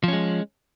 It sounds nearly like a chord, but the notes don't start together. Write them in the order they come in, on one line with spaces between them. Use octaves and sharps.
F3 C#4 G#3